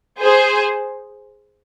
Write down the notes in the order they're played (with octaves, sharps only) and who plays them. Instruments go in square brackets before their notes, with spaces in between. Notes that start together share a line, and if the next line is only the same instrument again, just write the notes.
[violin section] G#4 C5